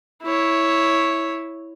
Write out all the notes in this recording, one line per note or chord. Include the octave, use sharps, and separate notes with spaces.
E4 C#5